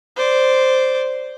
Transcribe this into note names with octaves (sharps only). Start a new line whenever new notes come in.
C5 D5